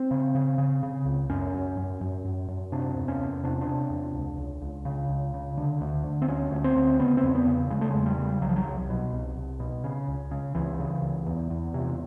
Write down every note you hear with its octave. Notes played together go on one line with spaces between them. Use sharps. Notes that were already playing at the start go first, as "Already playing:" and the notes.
Already playing: C4
C#3
C#3
C#3
C#3
C#2
F#2 C#4
F#2
F#2
F#2
F#2
F#2
C3 D4
E2
C#4
E2
C3 D4
D4
C3
E2
C#2
C#2
C#2
C#3
C#2
C#3
D3
D2
D3
C4
D2 C#4
D2
C4
D2
C#3 B3
C4
E2
B3
C#3
C#3 G#3
A3
E2 G#3
G3
C#3
C2 F#3
F3
F#3
C2
B2
C2
C2
B2
C#3
C#2
C#3
C#2 E3
C#3
C#2
E2
E2
C3